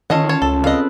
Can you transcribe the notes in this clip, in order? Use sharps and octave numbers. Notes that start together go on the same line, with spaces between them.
D#3 C#4 F4 A4 C#5 D#5 F#5
C#5 A5
C#2 A4
C4 A4 B4 D#5 F5